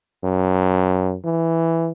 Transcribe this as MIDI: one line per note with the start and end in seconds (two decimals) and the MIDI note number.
0.23 1.15 42
1.25 1.92 52